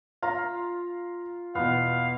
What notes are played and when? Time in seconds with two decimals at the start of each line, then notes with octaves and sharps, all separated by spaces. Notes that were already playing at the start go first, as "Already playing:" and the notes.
0.22 F4 F5 A#5
1.55 E2 B2 B3 F5